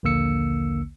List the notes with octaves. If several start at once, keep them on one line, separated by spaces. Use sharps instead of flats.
A#1 D#2 D3 A#3 E6 C#7